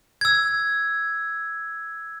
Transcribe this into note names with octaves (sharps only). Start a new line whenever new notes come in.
E6 G#6